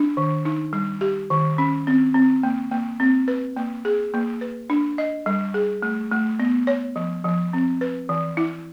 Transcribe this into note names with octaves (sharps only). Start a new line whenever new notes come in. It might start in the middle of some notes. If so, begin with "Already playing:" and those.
Already playing: D4
D#3
D#4
G3
G4
D#3
C#4
C4
C4
A#3
A#3
C4
B4
A#3
G#4
A#3
B4
D4
D#5
G3
G#4
A3
A3
B3
C#5
F3
F3
C4
B4
E3
E4